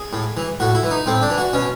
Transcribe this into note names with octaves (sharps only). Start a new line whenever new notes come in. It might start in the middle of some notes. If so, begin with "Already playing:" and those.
Already playing: G#4
A2
E3
A2 F#4
E4
E3
D#4
A2 C4
D4
E3
F#4
B2 C#4